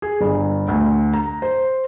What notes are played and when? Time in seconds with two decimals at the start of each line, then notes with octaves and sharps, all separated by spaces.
0.02 G#4
0.21 G1
0.68 D2
1.14 A#5
1.42 C5